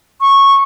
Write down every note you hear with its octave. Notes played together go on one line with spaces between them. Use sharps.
C#6